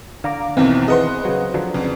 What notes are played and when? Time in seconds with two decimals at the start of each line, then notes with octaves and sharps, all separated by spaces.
0.24 D3 F5 A#5 D6
0.57 B1 E2 B2 D#3 E3 C4
0.88 G#4 B4 C5 D#5 F#5 C6
1.25 C#3 F#3
1.54 D3 F3 F#3
1.74 F2 C#3